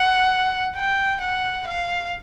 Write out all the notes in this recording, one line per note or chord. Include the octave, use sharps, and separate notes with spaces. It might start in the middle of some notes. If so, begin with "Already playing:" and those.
Already playing: F#5
G5
F#5
F5